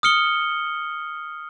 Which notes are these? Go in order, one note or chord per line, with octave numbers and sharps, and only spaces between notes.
D#6 F6 C#7 G7